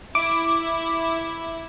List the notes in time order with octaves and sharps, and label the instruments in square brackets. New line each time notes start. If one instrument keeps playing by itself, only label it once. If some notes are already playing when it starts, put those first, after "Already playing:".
[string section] E4 [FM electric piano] D6